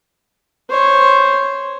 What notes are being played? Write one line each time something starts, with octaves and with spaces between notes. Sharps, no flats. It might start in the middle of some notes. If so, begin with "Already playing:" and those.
C5 C#5